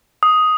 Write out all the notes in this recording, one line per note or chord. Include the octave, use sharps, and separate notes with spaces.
D#6